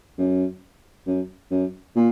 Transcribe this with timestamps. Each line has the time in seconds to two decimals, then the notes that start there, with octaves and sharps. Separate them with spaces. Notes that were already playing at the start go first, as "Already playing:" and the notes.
0.18 F#2
1.06 F#2
1.51 F#2
1.96 A#2